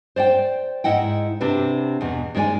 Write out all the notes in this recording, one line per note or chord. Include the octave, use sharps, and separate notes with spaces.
C5 D5 F#5 G5
G#2 E4 D#5 F#5 G5
C3 D4 F#4 B4
E2 B2
D#3 G#3 G#4 D5 G#5